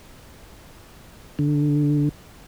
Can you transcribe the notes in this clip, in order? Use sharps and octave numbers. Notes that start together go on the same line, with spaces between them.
D3